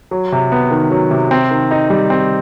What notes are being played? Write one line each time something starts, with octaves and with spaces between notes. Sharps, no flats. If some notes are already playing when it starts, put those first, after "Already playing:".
F#3
C3
B3
D#3
F#3
C3
C4
D#3
D#4
G3
C4